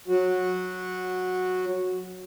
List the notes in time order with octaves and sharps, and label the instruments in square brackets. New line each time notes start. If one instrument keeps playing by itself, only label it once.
[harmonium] F#3 F#4